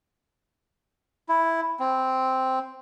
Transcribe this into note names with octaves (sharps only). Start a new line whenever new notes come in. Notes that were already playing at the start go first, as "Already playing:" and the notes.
E4
C4